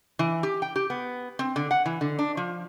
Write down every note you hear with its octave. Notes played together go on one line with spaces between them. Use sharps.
E3
G4
G5
G4
B3
C4
D3
F#5
E3
D3
D4
F3